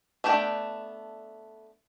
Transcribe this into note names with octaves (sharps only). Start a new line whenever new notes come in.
A3 B3 D4 G5